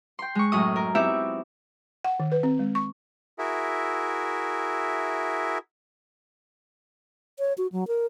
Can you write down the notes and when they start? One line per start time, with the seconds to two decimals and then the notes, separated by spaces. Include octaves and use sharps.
0.19 G5 C6
0.35 G#3 C#6
0.52 F#2 A2 D#5 D#6
0.76 A#4
0.95 B3 C4 D#4 E4 G4 E5
2.05 F#5
2.20 D#3
2.32 B4
2.43 C4
2.59 G#3
2.75 C#6
3.39 E4 F#4 G#4 A#4 E5
7.39 C#5
7.58 F#4
7.72 F#3
7.88 A#4